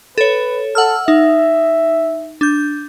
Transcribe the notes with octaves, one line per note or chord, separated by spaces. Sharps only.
A4 B4 C#5
A4 F#5 E6 F6
D#4 E5
D4 G6